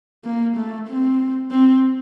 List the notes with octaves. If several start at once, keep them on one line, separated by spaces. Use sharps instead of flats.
A#3
A3
C4
C4